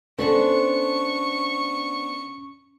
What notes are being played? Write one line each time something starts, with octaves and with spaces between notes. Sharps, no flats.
C3 B3 C#4 D4 A4 B4 C5 C#6